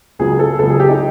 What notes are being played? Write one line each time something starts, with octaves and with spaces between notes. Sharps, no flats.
C#2 C#3 F#3 G#4
A4
C#2 C#3 F#3 A4
G#4
G4
D#4